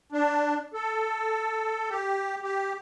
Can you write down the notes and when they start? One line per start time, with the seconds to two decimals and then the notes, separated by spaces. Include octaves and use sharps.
0.12 D4
0.74 A4
1.90 G4
2.42 G4